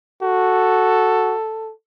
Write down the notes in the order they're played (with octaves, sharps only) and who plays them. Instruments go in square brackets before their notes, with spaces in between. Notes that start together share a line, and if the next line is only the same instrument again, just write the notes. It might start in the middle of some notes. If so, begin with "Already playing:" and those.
[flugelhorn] F#4 [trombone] A4